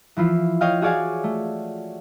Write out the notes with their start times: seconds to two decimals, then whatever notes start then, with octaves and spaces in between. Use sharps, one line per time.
0.17 E3 F3 E4 F4
0.61 C#5 D#5 F5 G5 F6
0.82 F#4 G#4 C#5 D5 F5 G#5
1.24 A3